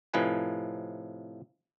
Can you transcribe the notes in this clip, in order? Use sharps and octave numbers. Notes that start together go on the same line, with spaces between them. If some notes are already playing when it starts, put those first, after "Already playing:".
A2 C3 F3 D#4 B4 G#5